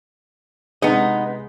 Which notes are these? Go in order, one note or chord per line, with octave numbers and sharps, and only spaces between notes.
C3 G#3 B3 D#4 D#5 C#7